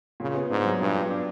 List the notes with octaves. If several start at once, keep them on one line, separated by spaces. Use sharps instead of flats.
A#2 C#3
B3
G#2 D4
F#3
G2 A#2
B3
D4